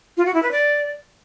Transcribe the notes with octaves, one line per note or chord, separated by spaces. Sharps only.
F4
F#4
E4
B4
D5